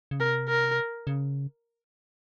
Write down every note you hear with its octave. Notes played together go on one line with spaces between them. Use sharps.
C#3
C3 A#4
A#4
C#3